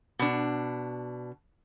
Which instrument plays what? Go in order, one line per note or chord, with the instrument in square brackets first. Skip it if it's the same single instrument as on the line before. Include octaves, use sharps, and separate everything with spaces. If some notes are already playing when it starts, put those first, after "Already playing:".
[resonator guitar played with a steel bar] B2 D4